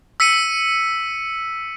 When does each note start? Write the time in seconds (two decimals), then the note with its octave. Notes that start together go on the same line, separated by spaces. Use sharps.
0.20 E6 B6 C#7 D#7